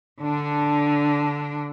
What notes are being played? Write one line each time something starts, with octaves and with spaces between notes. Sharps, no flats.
D3 D4